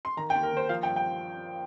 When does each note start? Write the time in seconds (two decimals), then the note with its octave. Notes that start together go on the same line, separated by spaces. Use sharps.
0.05 C6
0.17 D#3 A#5
0.30 G5
0.35 D#2
0.43 A#4
0.52 D#2 C5
0.69 F3 F5
0.83 G5
0.87 G2
0.96 G5